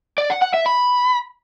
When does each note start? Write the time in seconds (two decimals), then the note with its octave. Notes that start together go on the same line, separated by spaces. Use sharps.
0.18 D5
0.30 F#5
0.42 F#5
0.54 E5
0.66 B5